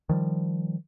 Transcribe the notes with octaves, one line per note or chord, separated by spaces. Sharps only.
D#3 F3 G3